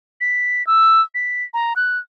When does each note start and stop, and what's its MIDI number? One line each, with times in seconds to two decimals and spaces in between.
0.21 0.65 95
0.67 1.01 88
1.15 1.44 95
1.54 1.73 82
1.76 1.98 90